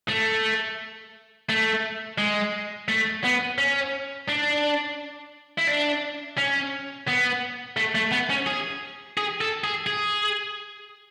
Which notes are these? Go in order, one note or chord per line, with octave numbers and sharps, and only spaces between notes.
A3
A3
G#3
A3
B3
C#4
D4
E4
D4
C#4
B3
A3
A3
B3
C#4
G#4
G#4
A4
G#4
G#4